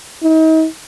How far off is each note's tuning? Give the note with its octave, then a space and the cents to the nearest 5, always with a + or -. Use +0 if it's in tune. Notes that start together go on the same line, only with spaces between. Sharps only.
D#4 +40